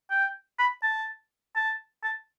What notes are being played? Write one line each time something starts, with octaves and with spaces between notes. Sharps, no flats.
G5
B5
A5
A5
A5